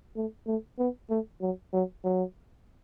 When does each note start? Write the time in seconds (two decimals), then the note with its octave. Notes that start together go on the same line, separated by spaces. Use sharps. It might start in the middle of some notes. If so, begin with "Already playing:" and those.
0.16 A3
0.47 A3
0.79 B3
1.10 A3
1.41 F#3
1.73 F#3
2.04 F#3